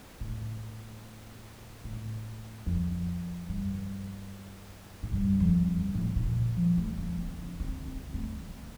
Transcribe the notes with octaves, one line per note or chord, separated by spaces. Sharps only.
A2
A2
F2
G2
A2
G2
F2
G2
A2
A#2
F3
A3
A#3
C4
D4
C4
C4
A3
A#3